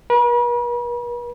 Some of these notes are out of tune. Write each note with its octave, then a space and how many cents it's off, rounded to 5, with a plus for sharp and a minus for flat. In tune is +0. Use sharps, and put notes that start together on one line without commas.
B4 -45